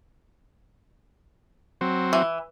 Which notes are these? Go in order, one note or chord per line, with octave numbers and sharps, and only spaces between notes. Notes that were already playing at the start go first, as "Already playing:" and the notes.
F#3 C4
E3